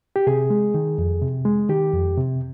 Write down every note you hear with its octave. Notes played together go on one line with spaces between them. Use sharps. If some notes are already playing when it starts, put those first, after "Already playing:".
G4
C3 G#4
G#3
D#3
F2
C3
G#3
D#3 G4
F2
C3